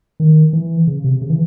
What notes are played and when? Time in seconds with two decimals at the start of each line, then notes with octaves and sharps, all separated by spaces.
0.20 D#3
0.53 E3
0.87 C#3
1.04 C3
1.21 C#3
1.30 E3